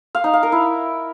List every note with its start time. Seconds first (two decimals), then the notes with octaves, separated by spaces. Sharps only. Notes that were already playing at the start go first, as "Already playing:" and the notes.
0.15 F5
0.24 D#4
0.33 F5
0.43 A#4
0.52 E4